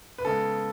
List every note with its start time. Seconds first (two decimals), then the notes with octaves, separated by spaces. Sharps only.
0.18 B4
0.25 C#3 G#3 B3 A4